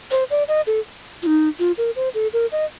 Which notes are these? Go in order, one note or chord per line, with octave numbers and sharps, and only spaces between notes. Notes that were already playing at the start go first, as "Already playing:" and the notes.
C5
D5
D#5
A4
F4
D#4
F4
A#4
C5
A4
A#4
D#5